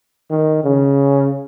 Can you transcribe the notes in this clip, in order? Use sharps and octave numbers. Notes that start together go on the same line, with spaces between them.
D#3
C#3